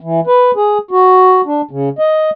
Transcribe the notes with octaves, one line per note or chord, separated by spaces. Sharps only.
E3
B4
G#4
F#4
D4
C#3
D#5